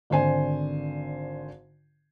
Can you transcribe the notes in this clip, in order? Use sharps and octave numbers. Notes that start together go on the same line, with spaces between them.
G#1 D3 C5 G#5